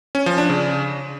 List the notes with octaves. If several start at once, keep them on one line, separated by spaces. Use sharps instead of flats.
C#4
F3
D4
C#3